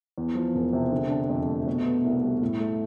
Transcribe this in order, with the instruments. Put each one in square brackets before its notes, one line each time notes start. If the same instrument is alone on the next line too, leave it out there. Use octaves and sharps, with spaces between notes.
[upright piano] E2
F3
E1
C3
D3
D4
F2
A3
B2
B3
C2
G3
A2
A3